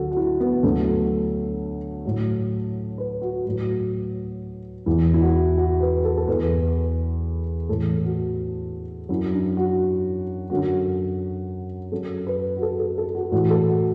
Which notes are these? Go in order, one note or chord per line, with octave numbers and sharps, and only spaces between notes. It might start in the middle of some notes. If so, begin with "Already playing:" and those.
Already playing: D2 D3 F#3 F#4 A4
F#4
E4
B3
D2 D3 F#3 A3
A2 F#3
B4
F#4
A2 F#3 F#4
E2 E3 E4
E4
F#4
F#4
B4
A4
A4
E2 E3 B4
A2 E3 A4
F#4
F#2 F#3 E4
D4
F#4
F#2 D3 F#3 F#4
F#2 F#3 A4
B4
F#4
A4
A4
A4
F#4
A2 E3 F#4
A4
F#4